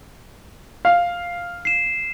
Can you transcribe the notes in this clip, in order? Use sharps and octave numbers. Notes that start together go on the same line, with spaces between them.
F5
C7 E7